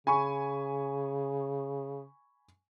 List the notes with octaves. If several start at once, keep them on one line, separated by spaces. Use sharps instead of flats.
C#3 G#5 B5 C#6